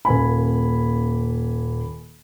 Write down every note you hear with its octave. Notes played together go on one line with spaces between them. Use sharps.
D#1 A#3 G#5 B5